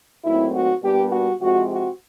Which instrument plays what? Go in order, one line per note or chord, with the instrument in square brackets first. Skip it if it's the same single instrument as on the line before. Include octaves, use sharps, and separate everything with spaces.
[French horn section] A#2 F#3 A3 C4 D#4 E4
F#4
A#2 G3 B3 D4 G4
F#4
C3 F3 G#3 C4 F#4
F#4